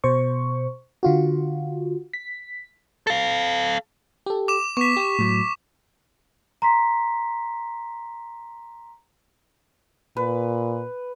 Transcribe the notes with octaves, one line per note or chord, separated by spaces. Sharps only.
B2 C5 C#6
D3 F4 F#4
B6
A4 F5
G4 A4
D6 E7
B3 C#6 B6
G4
A2 F#3
A#5 C6 B6
A#2 B4